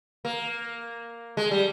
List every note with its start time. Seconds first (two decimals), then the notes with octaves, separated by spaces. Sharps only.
0.25 A#3
1.37 G#3
1.51 G3